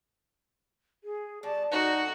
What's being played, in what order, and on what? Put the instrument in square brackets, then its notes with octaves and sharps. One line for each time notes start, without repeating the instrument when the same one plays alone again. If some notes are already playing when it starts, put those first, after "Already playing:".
[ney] G#4
[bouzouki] B2 G3 D5 [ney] A5
[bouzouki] D3 A3 C4 [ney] D#4 [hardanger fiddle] F#4